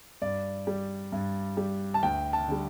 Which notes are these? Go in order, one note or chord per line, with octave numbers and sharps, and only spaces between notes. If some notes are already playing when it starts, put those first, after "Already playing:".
G2 D5
G3
G2
G3
A5
D2 G5
A5
D3 G3